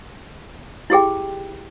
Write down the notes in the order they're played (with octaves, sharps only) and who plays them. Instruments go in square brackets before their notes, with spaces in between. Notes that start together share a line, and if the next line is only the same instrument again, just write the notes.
[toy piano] E4 G4 G#4 G5